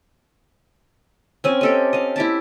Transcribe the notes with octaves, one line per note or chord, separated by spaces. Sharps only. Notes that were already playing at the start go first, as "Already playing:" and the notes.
C4 C#4 G#5
G4 A4 D#5
D#5 F5
E4 G4 A5